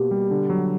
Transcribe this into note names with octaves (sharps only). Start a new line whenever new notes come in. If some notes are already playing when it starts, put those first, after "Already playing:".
Already playing: B2 A#3 G4
G3
D3
F#3